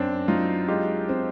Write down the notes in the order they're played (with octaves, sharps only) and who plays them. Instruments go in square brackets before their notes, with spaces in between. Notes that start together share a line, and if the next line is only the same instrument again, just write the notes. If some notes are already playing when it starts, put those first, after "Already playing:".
Already playing: [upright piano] F#2 [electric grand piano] C4 D4
[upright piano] F#3 [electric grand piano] D#4 F4
[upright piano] G#3 [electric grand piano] F4 G4
[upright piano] C4